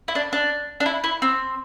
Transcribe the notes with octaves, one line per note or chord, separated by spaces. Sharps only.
E4
D4
D4
D4
E4
E4
C4